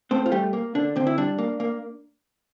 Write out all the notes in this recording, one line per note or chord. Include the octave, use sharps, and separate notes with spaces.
A3 C4 C5
F4
G3 A3 G4
A#3
D3 D4
D3 C4
E4
G3 D4
A#3
A#3